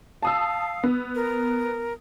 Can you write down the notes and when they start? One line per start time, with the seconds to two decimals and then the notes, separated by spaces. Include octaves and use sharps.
0.23 F5 A5 D#6 E6
0.83 B3
1.15 A#4